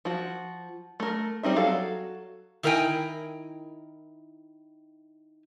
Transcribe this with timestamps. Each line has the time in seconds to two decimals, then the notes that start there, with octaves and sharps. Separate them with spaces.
0.05 F3 F#4
1.00 A3 A#4
1.43 G3 C4 D#4 E5
1.56 F#3 F#4 A4 F5
2.63 D#3 E4 A#4 C5 G5 G#5